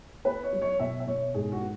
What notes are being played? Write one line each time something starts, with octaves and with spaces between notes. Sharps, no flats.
B3 B4
C#5
F#3
C#5
B2 E5
E5
B2 C#5
G#2 G#4
F#4
B3